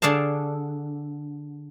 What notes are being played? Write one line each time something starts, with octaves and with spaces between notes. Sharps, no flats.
D3 D4 G#4 F5 A5